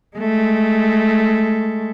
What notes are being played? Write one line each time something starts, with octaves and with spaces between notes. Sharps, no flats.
G#3 A3